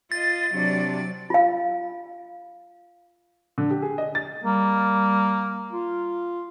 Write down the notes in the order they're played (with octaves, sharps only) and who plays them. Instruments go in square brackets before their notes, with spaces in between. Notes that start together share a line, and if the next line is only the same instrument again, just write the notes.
[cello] F4 D#5 [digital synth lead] A6
[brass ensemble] C3 D4 [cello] F#3 D5
[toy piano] F4 F5
[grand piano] D3
G4
G#4
D#5
A6
[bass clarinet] G3 [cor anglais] A#3
[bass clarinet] F4